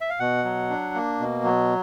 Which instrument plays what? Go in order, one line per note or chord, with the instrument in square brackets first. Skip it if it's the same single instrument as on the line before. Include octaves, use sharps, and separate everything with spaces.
[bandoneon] E5
F5
B2 F#5
F#3
D4
A#3
B2
F#3